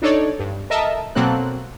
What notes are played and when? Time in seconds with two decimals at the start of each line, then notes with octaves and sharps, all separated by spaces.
0.02 D4 D#4 A4 C#5 D5
0.39 G2
0.70 A4 A#4 D#5 E5 A5
1.15 B2 F#3 A#3 C4 A4 F#6